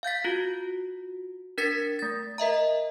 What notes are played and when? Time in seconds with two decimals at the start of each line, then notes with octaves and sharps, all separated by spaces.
0.03 F5 G6 A6 B6
0.24 F4 F#4
1.58 D4 A#4 A6 B6 C#7
1.99 A3 A6
2.38 A#4 D#5 E5 A#5